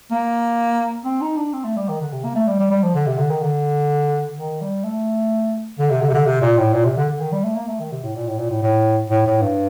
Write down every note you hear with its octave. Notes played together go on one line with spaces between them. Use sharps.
A#3
C4
D#4
D4
C4
A3
G3
D#3
D3
C3
A#3
A3
G3
G3
G3
F3
D3
C3
D3
D#3
D3
D#3
G3
A3
D3
C3
D3
C3
D3
C3
A#2
A2
A#2
C3
D3
D3
D#3
G3
A3
A#3
A3
D#3
C3
A2
A#2
A2
A#2
A2
A2
A2
A2
G2